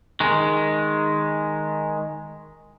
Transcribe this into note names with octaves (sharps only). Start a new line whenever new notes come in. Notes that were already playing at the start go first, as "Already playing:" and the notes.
D#3 G#3